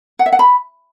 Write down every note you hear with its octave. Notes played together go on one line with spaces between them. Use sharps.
F#5
E5
F#5
B5